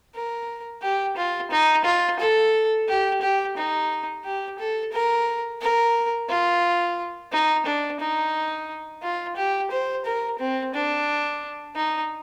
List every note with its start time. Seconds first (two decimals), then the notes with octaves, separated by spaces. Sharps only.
0.15 A#4
0.82 G4
1.16 F4
1.51 D#4
1.85 F4
2.19 A4
2.88 G4
3.21 G4
3.57 D#4
4.24 G4
4.59 A4
4.92 A#4
5.61 A#4
6.29 F4
7.32 D#4
7.66 D4
8.00 D#4
9.03 F4
9.36 G4
9.71 C5
10.05 A#4
10.39 C4
10.74 D4
11.76 D#4